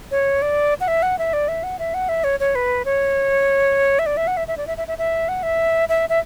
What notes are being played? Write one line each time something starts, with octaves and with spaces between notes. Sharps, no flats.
C#5
D5
F#5
E5
F#5
E5
D5
E5
F#5
E5
F#5
E5
C#5
C#5
B4
C#5
E5
D5
E5
F#5
E5
E5
D5
E5
E5
E5
E5
F#5
E5
E5
E5